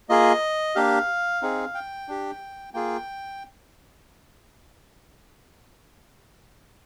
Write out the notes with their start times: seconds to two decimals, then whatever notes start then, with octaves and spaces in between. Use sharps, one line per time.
0.09 A#3 F4 G#4 D#5
0.75 A#3 D4 G4 F5
1.42 C4 D#4 G#4
1.75 G5
2.08 D4 G4
2.74 A#3 F4 G#4 G5